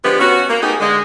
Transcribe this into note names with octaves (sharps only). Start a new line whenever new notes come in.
D3 F3 G#3 B3 G4
B3 C#4 F#4
A#3
A3 B3 D#4 G4 G#4
D3 G#3